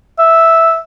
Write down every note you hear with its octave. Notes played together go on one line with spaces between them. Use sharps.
E5